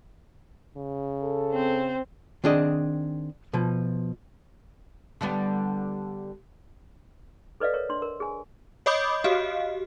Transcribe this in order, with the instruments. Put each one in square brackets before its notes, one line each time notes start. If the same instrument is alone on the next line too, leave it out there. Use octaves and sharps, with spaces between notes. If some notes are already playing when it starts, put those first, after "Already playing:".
[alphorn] C#3
[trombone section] A4
[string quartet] C4 C5
[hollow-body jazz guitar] D#3 C4 D4 G#4 D#5
B2 F3
[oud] D3 G3 B3
[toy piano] A4 B4 D5 D#5 F5
A#4 C#5
D4 C6
A#4
G#4 G#5
[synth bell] C#5 D#5 B5 D6 D#6 G6
F#4 G4 D#5 F5